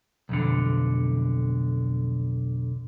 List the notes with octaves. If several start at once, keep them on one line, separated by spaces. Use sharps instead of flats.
B1 F2 D3